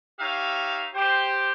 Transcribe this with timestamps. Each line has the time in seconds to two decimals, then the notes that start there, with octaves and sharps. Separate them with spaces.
0.20 D#4 G4 C#5 E5 F5
0.95 G4 C5